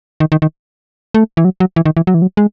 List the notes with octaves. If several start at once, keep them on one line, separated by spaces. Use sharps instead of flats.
D#3
D#3
D#3
A3
E3
F#3
F#3
E3
D#3
E3
F#3
E3
F#3
G#3